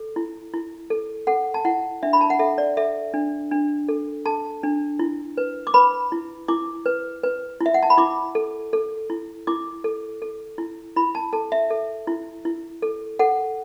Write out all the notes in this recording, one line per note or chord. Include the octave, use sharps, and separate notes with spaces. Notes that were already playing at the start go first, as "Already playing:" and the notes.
Already playing: A4
E4
E4
A4
A4 F#5
A5
E4 F#5
D4 E5
B5
A5
F#5
A4 E5
D5
A4 E5
D4
D4
A4
A4 A5
D4
E4
B4
D6
B4 B5
E4
E4 D6
B4
B4
E4
E5
F#5
A5
B5
E4 D6
A4
A4
E4
E4 D6
A4
A4
E4
E4 B5
A5
A4 A5
E5
A4
E4
E4
A4
A4 F#5